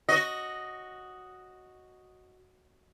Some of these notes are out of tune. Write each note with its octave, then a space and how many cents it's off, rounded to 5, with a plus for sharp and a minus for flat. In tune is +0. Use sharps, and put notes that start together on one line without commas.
F#4 +0 D#5 +0